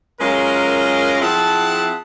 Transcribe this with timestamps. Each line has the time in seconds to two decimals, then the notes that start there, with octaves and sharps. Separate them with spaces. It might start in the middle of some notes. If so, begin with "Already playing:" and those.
0.21 F#2 G#3 C#4 F4 A#4
1.22 F3 C4 E4 G#4 F#5 A5